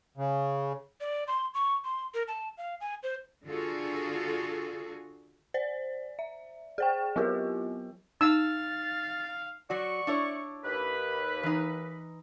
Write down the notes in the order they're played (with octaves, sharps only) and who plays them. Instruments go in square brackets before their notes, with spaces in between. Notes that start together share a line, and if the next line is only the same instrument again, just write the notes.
[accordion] C#3
[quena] D5
C6
C#6
C6
A#4
A5
F5
G#5
C5
[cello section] D3 F4 F#4 G#4 A4
[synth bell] C5 D5
E5
G#4 C5 G5
F#3 B3 E4 F4 G4 A#4
[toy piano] D#4 [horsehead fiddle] F5 [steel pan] E6 [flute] A6
[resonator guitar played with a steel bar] F#3 F#4 [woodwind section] D5 C#6
[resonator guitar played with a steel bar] D4 E4 C#5
[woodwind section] D#2 B4
[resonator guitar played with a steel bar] E3 D#4